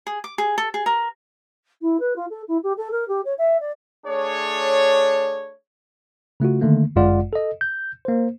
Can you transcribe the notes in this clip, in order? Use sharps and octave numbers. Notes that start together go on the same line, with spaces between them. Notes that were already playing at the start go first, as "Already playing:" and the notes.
G#4
D6
G#4
A4
G#4
A#4
E4
B4
F4
A4
E4
G4
A4
A#4
G4
C#5
E5
D5
A3 D4 G#4 C#5
C#3 A3 F4 F#4
D3 D#3 A3 A#3
G1 F#2 G#3 F4 D5 F#5
A4 D#5
G6
A#3 C5